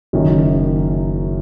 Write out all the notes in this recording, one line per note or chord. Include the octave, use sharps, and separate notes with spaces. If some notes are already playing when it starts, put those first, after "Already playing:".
F#1 F#2 D#3